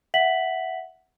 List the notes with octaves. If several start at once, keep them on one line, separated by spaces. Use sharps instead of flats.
E5 F#5 B6 F#7